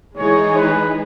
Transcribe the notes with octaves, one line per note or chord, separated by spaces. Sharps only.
E3 G#3 D#4 G#4 C#5
B4